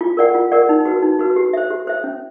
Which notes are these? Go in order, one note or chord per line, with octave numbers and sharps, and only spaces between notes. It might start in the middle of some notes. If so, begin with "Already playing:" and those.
F4
A#4 D5 F#5
F4
A#4 D5 F#5
D#4
F#4 B4
D#4
F#4 B4
G4
C5 E5
G4
C5 E5
C#4